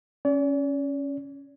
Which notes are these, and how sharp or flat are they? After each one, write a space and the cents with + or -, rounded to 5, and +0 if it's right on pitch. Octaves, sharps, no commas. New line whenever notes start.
C#4 +0 D5 -40